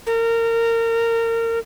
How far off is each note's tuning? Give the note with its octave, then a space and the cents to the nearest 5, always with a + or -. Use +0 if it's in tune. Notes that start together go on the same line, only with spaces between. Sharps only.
A#4 -25